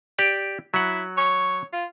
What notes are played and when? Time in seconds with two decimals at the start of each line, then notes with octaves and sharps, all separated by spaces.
0.19 G4 D5
0.74 F#3 E4 F#5
1.17 C#5
1.73 F4